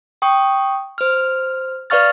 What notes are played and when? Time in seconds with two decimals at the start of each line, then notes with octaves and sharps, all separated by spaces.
0.22 G5 C#6 D#6
0.98 C5 F6
1.90 B4 D5 F5 C#6 F6 A6